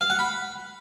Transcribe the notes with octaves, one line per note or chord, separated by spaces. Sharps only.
F5
F#5
B5